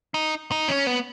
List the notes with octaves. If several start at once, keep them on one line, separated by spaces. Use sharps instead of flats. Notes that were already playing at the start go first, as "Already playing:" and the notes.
D#4
D#4
C#4
B3